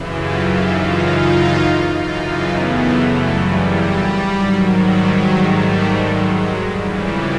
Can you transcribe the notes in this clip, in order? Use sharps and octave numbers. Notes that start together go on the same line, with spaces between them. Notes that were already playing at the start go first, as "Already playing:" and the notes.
Already playing: F#2 C#3 E3
F4 G4
D#4 F4
D#4 F4
F#2 C#3 E3 D#4 F4
D#4 F4
A3 B3
G3 A3
G3
G#2 D#3 F#3
G3
F#3 G#3
G3 A3
F#3 G#3
F#3 G#3
F2 C#3 E3 G3
G3